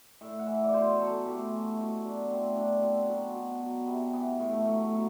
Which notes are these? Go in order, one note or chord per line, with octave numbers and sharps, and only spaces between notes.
A2 E5
F#5
E3 E5
D5
B2 C5
F#3 A4
A2 G4
E3 F#4
B2
F#3 D4
A2 C4
F#3 D4
B2 C4
F#3 B3
B2
F#3
C3 B3
E3 B3
A2 B3
A3
F#3 A3
A3
B2 F#3